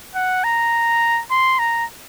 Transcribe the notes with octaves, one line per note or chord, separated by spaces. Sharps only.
F#5
A#5
C6
A#5